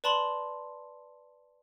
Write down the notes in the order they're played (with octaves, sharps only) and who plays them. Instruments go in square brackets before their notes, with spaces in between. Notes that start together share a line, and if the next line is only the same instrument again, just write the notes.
[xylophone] B4 D5 A5 B5 C6 F#7